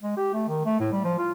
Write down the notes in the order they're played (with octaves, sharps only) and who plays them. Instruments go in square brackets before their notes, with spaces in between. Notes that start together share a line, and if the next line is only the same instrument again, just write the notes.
[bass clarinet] G#3
G4
A3
D#3
A3
A2
G3
F3
F4